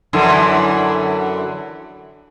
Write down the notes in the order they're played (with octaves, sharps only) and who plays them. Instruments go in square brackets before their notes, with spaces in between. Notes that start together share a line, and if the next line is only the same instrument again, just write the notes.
[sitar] F#2 D3 E3